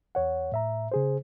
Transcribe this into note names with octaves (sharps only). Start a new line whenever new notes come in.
E2 C#5 F#5
A2 E5 A#5
C#3 G#4 C5